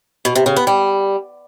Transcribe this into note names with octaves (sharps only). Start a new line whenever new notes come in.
B2
C3
C#3
B3
G3